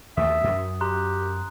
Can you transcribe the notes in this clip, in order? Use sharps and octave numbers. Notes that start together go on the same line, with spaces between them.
D#2 A3 E5 D#6
F#2
G4 A#5 C6 F#6